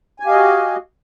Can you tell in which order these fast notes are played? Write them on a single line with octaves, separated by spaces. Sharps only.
G#5 G4 F5 D#5 F#4